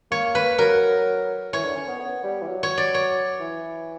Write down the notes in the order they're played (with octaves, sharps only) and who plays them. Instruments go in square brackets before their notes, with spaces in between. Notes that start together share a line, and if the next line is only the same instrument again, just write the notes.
[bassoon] A#3 [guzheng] C#5
[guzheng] B4
[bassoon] F#3 [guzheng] A#4
[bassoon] E3 [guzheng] C#5
[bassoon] D3
C#4
B3
B3
G3
E3
F#3
[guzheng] C#5
D5
C#5
[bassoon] E3